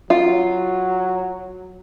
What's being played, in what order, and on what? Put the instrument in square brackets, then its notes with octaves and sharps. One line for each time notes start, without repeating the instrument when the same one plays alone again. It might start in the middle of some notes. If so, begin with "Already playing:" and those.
[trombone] F#3 [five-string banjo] F4